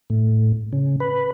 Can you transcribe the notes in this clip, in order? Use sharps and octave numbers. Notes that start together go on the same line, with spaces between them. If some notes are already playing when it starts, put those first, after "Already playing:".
A2
C#3
B4